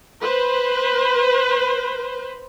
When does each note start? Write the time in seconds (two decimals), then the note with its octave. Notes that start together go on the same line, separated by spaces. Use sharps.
0.21 B4 C5